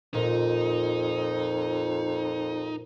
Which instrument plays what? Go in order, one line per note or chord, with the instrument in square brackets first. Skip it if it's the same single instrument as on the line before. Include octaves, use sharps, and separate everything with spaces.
[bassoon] F2 [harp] A#2 [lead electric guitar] D#4